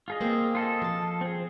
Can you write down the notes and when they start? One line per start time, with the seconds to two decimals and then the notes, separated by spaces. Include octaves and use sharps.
0.08 F4 G#4 D#5
0.21 A#3 C4
0.55 F4 A4 D#5
0.82 F3 A5
1.21 C4 G#4